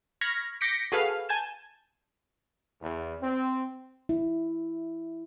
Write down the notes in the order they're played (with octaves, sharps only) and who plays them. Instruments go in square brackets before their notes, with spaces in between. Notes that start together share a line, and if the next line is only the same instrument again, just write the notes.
[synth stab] B5 C#6 F6 G#6 A#6
D6 G6 A#6 B6 C#7 D7
F#4 G#4 A4 B4 F5 F6
G#5 A5 G6 G#6 E7
[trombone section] E2
C4
[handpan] E4